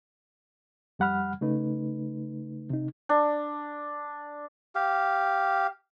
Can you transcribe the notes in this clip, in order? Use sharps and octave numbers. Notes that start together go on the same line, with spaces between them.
F2 G3 F#5 B5 F6
C#3 A3 D#4 B4
C3 D#4
D4
G4 F5